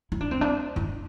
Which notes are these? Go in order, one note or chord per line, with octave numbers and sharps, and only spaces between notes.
E4
D4
C4
D4
E4